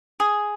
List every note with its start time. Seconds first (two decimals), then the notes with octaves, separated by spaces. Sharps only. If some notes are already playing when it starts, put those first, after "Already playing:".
0.20 G#4